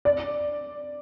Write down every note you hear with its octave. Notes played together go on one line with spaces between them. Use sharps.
D5